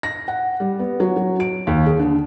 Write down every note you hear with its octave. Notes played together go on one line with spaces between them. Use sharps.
A#6
F#5
G3
B3
F#3
F#3
D7
D#2
G#4
D3